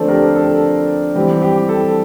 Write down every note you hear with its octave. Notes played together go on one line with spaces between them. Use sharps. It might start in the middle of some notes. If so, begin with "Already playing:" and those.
Already playing: D3 F3 A3 C4 A4 C5 D5
G4 A#4
A4
E3 G3 C4 G4
G4
A4